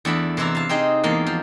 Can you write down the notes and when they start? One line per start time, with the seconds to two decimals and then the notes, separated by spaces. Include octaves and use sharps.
0.05 E2 A3 D4 A4 B5
0.37 C3 E3 E4 A4 A#5
0.55 F5 A5
0.69 C4 D#4 G#4 D#5
1.04 E2 G#3 A#3 A4 D#5
1.26 F3